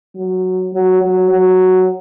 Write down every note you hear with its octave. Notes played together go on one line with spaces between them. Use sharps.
F#3
F#3
F#3
F#3